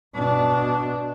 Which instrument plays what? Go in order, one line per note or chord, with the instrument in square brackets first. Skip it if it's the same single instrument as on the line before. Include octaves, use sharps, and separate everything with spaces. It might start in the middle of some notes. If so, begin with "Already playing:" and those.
[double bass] B2 D4